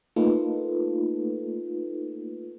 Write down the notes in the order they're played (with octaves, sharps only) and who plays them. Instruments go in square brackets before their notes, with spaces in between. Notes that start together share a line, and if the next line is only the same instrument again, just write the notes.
[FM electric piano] A3 A#3 D#4 F4 A4 B4